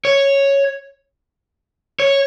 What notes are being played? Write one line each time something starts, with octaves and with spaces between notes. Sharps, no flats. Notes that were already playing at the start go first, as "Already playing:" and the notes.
C#5
C#5